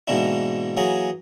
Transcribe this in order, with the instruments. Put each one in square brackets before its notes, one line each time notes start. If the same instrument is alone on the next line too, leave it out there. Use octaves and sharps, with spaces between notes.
[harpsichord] G#2 B2 E3 A#3 D4 E4
E3 F#3 A#3 G#4